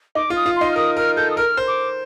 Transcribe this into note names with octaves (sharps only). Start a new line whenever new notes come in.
D#4 D6
F4
D#6
F4
D#4 C6
F6
A#4 D#6
A#4 F6
A4 G6
D#6
A#4 F6
C5
D6